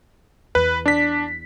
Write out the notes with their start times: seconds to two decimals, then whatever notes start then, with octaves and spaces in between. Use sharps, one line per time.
0.55 E2 B4
0.86 D4 B6